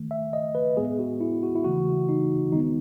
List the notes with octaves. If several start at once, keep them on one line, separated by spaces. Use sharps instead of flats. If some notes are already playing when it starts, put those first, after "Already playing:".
Already playing: D#3 A3
E5
D#5
B4
A2 G#3 B3 G#4
F#4
E4
F#4
E4
C#3 E3 A3 F#4
D#4
D#3 G#3 B3 D#4